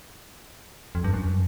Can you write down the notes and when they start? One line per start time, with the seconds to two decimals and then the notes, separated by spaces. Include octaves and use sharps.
0.95 F2
1.04 G2
1.14 F#2